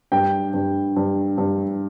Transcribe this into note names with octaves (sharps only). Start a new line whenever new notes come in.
G2 G5
G2
G2
G2